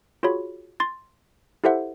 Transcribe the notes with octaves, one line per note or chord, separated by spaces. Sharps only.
F4 F#4 G#4 C#5 B5
C6 A6
E4 G4 A4 C5 E5 F#5